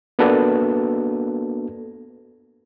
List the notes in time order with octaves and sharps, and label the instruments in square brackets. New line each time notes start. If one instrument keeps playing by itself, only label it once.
[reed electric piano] A#3 B3 D4 F#4 A4 B4